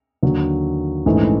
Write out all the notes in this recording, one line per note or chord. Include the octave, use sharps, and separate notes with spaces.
D#2 D3 F#3
A#1 G#2 E3 A3 C#4